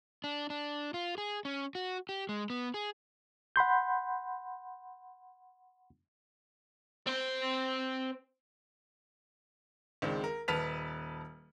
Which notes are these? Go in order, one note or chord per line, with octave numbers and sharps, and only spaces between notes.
D4
D4
F4
G#4
C#4
F#4
G4
G#3
B3
G#4
F#5 B5 C6 G6
C4 C5
C#2 D#3 G#3 C4 D4
A#4
D#1 B4 A5 F6 B6 F7